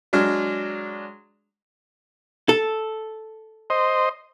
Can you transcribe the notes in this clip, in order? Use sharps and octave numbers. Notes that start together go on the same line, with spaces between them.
F#3 G#3 D4 F6
A4
C5 D#5